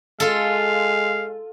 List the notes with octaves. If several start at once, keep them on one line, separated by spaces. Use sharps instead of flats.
G#3 F4 A4 F5